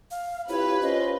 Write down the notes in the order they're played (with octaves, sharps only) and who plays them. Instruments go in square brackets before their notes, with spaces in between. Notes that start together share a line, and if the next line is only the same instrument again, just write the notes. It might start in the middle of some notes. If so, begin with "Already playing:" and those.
[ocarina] F5
[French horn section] C4 F4 G4 [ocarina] E4 [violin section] B4 [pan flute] C#5
[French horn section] C#4 F4 [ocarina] C5 [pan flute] D#5